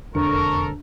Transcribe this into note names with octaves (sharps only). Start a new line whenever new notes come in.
E1 F2 D3 D4 A4 A#4 C#6